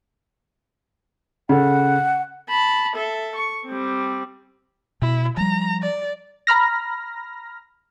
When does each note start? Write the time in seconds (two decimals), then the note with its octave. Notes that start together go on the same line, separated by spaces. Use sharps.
1.49 C#3 A4 F#5
2.49 A5 B5
2.96 A4 E5
3.35 C#6
3.67 G3 C4
5.02 B2 E4
5.37 F3 G3 A#5
5.82 D5
6.47 A#5 B5 F6 A#6